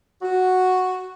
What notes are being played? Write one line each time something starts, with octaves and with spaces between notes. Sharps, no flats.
F#4